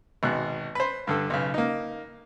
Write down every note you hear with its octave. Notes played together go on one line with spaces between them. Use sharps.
G#1 B2 F#6
B4 C5
G2 D3 A4
B1 C#3
A#3 D#4